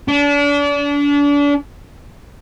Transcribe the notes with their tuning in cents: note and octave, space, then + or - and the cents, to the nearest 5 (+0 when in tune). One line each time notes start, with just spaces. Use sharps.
D4 -35